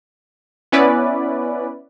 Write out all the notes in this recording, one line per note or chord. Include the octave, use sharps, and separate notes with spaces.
B3 C#4 E4 B4 D5